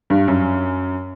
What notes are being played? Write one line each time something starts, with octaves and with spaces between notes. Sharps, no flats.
G2
F#2